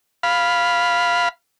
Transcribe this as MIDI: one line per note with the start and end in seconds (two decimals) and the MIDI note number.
0.23 1.29 77
0.23 1.29 83